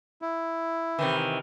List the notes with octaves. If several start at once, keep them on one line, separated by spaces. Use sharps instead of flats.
E4
C3 D#3 E3